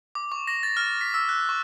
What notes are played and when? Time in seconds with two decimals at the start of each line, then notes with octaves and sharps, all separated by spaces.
0.15 D6
0.32 C#6
0.47 A#6
0.63 A6
0.77 F6
1.01 B6
1.14 E6
1.29 F#6
1.49 C#6